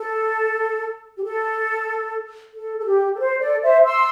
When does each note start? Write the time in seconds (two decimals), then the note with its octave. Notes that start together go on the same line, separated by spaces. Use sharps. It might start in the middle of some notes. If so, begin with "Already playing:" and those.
Already playing: A4
1.17 G4
1.24 A4
2.54 A4
2.78 A4
2.86 G4
3.15 A4
3.19 C5
3.40 A4 D5
3.62 C5 E5
3.84 C6 E6